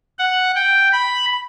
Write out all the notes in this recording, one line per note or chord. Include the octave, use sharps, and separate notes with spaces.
F#5
G5
B5